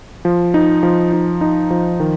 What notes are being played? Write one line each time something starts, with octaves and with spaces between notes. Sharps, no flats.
F3
D#4
F3
D#4
D#4
F3
D#3